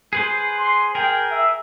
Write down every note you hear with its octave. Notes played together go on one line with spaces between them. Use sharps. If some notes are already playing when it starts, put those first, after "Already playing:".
G#4 B4 C5
C6
G#4 A#4 G5
E5